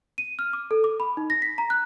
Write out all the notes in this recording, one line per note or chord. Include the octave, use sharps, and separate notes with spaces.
D#7
F6
D6
A4
D6
B5
D#4
A#6
B6
A#5
F#6